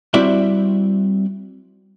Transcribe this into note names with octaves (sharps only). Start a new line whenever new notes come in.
G3 C4 E4 F#4 D5 E5